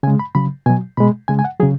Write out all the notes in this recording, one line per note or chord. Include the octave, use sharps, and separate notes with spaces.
C#3 G#3 G#5
B5
C#3 F#3 B5
B2 F#3 G#5
B2 G#3 B5
C#3 G#3 G#5
G#5
F#5
C#3 F#3 G#4